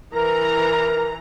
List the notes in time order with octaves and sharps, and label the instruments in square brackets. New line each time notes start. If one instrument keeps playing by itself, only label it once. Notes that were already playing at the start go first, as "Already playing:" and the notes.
[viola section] E3 A#5 [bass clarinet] A#4